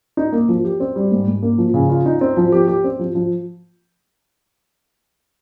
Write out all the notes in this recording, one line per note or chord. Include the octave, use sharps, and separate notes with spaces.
D#4
A#3
F3
G4
C4
G3
G#2
G#2
A#3
F3
C#3
F4
D#4
C4
F3
G4
G4
C4
F3
F3